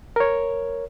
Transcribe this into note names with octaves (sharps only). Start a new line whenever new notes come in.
A#4 C#5